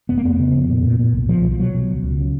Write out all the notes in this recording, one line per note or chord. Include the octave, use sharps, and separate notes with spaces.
F1 B3
A#3
F2 B3
C#3
F2
A#2
A#2
A#2
B1
B1 F3
B2
F3
B2 F#3
B2
C#2
C#2
C#3